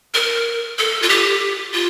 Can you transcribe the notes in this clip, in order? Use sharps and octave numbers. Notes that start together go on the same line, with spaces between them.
A#4
A4
F4
G4
F4